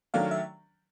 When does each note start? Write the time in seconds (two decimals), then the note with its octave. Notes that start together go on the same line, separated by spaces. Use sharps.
0.14 D#3 F#3 A3 D4 F5
0.31 E5